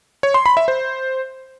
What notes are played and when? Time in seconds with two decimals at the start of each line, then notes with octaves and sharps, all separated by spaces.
0.23 C#5
0.34 C6
0.46 B5
0.57 E5
0.68 C5